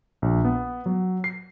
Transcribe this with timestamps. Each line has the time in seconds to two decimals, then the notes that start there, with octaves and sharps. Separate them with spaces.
0.22 A#1
0.45 B3
0.86 F#3
1.24 C7